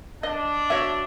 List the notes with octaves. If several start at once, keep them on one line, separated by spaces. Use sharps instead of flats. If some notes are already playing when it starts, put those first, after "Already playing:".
D4 D#5
F#4 C#5 E5